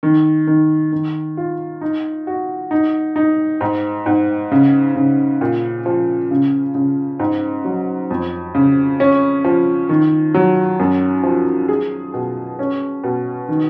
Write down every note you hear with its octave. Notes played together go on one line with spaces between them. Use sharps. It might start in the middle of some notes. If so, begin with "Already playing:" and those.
D#3
D#3
D#3
F4
D#4
F#4
D#4
D#4
G#2
G#2
C#3
C#3
A#2
F3
C#3
C#3
G#2
F#3
F2
C#3
C#4
F3
D#3
F#3
F#2
F3
G#4
B2
C#4
B2
D#3